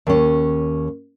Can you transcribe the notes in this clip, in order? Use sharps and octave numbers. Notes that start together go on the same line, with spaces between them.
D#2 C#4